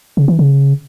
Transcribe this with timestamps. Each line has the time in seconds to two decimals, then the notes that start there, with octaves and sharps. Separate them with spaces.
0.17 C#3
0.28 E3
0.39 C#3